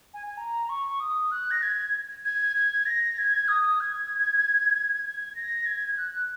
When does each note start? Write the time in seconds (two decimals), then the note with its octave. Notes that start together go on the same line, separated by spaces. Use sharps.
0.14 G#5
0.27 G#5
0.37 A#5
0.69 C#6
1.00 D#6
1.31 F#6
1.51 A#6
1.63 G#6
2.25 G#6
2.56 G#6
2.86 A#6
3.18 G#6
3.48 D#6
3.80 G#6
5.05 G#6
5.35 A#6
5.66 G#6
5.98 F#6